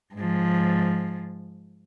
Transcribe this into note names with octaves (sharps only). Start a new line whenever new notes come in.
G#2 F3